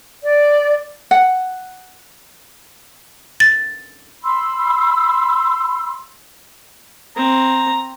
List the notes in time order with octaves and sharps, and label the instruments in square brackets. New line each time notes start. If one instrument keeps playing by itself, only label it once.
[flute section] D5
[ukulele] F#5
[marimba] A6
[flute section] B5 C6 E6
[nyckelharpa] C4 [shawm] A#5